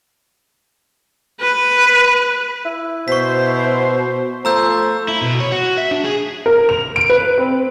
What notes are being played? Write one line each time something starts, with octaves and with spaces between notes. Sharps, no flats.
B4
E4
B2 C5 C#6 B6
F3 A3 C5 A#5 E6 G6
E4
B2
C#5
F#4
E5
D4
G#4
A#4
F7
D7
B4
C4